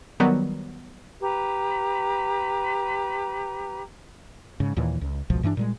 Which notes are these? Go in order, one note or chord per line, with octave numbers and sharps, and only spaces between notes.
D#3 F#3 G3 B3
G4 B4 A#5
G#2 C#3
D#2 A#2 E3
C#2
G#1 C#2 B2 F3
G2 E3 C4 D4
A#2 G3 G#3